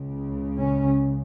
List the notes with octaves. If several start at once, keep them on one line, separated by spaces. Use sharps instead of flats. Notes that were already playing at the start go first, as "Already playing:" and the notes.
Already playing: C#2 C#3
C#4